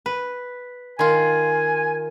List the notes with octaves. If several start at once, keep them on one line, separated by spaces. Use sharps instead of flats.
B4
D#3 F4 G#5